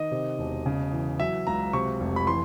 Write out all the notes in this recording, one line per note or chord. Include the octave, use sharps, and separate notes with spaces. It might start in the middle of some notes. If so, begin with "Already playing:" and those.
Already playing: D#3 D#5
C3
E1
C#3
E3
F#3 E5
C#2 A#5
C3 C#6
F1
B5
E3 C6